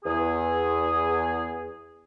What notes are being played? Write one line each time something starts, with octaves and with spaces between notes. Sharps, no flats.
E2 G#4